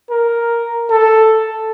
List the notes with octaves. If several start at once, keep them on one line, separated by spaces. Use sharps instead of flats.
A#4
A4